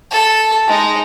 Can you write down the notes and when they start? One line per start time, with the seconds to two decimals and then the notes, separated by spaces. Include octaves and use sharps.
0.11 A4
0.68 G#3 D#4